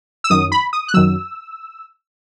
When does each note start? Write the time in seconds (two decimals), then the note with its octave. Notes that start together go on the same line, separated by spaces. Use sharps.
0.24 E6
0.30 F#2 D#3 F#3 D#6
0.52 B5
0.73 D#6
0.88 F#6
0.94 F#2 D#3 F#3 E6